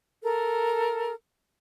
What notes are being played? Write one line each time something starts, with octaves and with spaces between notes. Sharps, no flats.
A4 A#4